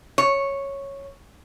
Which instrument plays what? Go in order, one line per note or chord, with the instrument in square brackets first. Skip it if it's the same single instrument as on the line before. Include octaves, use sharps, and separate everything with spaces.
[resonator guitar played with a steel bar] C#5